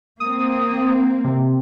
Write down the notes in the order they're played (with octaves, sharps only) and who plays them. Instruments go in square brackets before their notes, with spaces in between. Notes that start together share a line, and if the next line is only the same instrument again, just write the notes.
[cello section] A#3 C4 [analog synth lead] D#6
[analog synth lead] C3